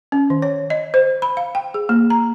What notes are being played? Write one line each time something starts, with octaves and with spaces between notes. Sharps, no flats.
C#4
D#3
C#5
D#5
C5
B5
F5
G5
G#4
A#3
A#5